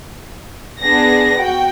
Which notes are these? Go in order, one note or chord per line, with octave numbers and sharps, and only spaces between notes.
B3 D4 G#4 A#6
F#4 G5